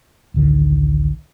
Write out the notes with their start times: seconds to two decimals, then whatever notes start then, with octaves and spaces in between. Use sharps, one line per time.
0.34 A1 D2 D3 D#3